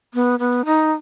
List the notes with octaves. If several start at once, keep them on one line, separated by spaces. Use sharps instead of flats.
B3
B3
D#4